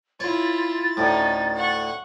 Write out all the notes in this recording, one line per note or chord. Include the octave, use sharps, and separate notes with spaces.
E4 F4 C#5 A6
D2 A2 C#4 D#4
F#5 C#6